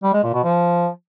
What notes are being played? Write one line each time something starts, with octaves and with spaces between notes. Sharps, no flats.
G3
G#3
A#2
B2
F3